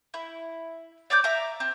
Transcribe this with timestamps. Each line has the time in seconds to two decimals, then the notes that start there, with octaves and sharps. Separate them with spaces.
0.14 E4
1.10 C#5 D5 D6 G6
1.24 E5 A#5 D6
1.60 C4